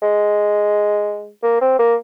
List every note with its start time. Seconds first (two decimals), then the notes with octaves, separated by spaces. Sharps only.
0.02 G#3
1.43 A#3
1.61 C4
1.79 A#3